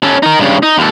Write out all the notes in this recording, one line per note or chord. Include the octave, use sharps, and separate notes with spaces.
C#4 A4
D#4 A#4
G2 C#3
D#4
D#2 A4